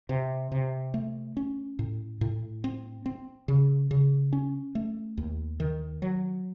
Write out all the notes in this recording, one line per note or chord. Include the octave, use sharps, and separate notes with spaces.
C3
C3
A3
C#4
A2
A2
C4
C4
C#3
C#3
C#4
A3
D#2
D#3
F#3